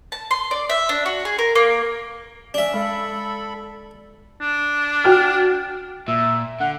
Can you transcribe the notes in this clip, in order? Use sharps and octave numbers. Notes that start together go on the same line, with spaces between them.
A5
C6
D5
E5
D4
F#4
G#4
A#4
A#3
C#4 D4 E5
G#3 A4 B5
D4
F#4 G5 F6
A#2 E5
D3 F#5